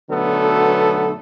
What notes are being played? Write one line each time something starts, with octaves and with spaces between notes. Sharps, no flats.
B1 D3 F#3 A3 B3 A4